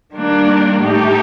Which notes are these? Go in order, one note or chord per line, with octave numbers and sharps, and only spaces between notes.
D#3 G3 A#3 D4
A2 A3 D#4 G4